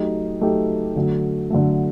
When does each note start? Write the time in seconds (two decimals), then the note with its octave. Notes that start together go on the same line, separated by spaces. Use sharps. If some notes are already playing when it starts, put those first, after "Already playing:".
Already playing: F#3 A3 D#4 G4
0.41 F#3 A3 D#4 G4
0.96 D3 F#3 A3
1.50 D3 F#3 A3